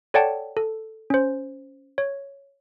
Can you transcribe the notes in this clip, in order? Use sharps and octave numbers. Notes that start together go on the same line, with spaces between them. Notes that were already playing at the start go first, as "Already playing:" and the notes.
A4 C#5 D5 F#5 G5 A5
A4
C#4 C5
C#5